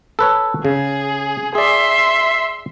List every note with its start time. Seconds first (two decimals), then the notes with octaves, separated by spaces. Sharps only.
0.19 A4 B4 C#5
0.65 C#3 G#4
1.55 G#4 D5 E5 C6